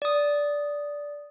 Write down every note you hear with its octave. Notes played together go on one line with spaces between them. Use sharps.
D5 D#6